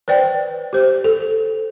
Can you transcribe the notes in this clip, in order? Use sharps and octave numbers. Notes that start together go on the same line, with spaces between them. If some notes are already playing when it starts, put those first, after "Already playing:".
B4 C5 D5 G5
G4 C5
A4